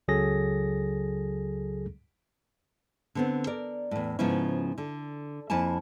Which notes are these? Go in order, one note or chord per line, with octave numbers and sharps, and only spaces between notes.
C#2 C#3 F#3 G#4 A4 A#6
D3 B3 C4
A#4 D5
E2 A2
G#2 C#3 F3 B3 C#4 E4
D3
F2 A#3 E4 G#5 A5